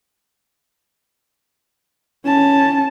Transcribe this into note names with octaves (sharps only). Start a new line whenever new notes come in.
C#4 A5